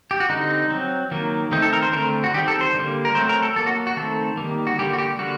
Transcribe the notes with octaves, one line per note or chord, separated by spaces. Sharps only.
G4
F#4
D3 G3 C4 D#4
F#3 C4
D#3 F#3 A#3
D#3 A3 C4 D#4
A4
A#4
C5
D3 A3 C4 A#4
F#4
D#3 G3 C4 G4
A4
C5
D3 G3 A#3
A#4
F#3 A3 C4 C5
A#4
A4
F#3 A#3 A4
F#4
F#4
D#3 A3 C4 A4
D#3 G3 A#3
F#4
D3 G3 A#3 G4
F#4
G4
D3 G3 A#3 F#4